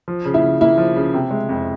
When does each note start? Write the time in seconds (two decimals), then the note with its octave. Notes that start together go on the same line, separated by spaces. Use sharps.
0.08 F3
0.25 C#3
0.34 E4
0.43 C#3
0.61 A#3 E4
0.78 F3
0.96 C#3
1.14 C3
1.31 G#3
1.49 F2